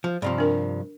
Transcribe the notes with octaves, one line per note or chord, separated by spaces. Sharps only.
F3
G2 C3 F3
D4 A#4